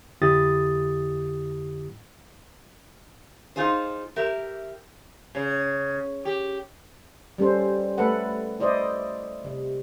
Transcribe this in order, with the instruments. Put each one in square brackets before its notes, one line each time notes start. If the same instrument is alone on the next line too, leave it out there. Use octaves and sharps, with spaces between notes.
[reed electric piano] F2 D3 E4 G4 D#6 A6
[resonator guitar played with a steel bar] D#4 F4 G#4 C5
G4 A#4 E5
[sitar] C#3
G4
[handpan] G3 C#4 A4 C5
A3 A4 B4 F#5
E4 C5 D5 D#5
C3